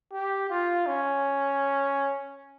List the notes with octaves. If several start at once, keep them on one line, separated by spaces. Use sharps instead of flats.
G4
F4
C#4